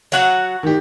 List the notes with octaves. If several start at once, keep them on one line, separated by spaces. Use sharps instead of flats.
F#3 F#4 F#5
D#3 G4